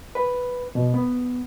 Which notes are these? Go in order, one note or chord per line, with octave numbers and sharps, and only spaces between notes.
B4
B2
B3